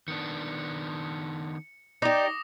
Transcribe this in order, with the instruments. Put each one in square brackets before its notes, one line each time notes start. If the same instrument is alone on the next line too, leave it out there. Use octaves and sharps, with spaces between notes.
[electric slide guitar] D#3 B3 D4 [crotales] C#7
[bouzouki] D#4 G4 [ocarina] D5 [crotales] D6 D#6 A#6